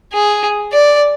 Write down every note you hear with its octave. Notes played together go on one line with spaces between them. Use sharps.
G#4
D5